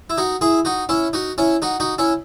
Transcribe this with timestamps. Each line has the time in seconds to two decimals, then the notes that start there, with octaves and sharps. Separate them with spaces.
0.10 E4
0.17 D#4 F#4
0.41 E4 G#4
0.65 D#4 F#4
0.89 C#4 E4
1.13 D#4 F#4
1.38 C#4 E4
1.62 D#4 F#4
1.80 D#4 F#4
1.98 C#4 E4